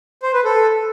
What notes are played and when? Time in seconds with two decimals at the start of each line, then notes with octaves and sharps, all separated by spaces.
0.23 C5
0.34 B4
0.44 A4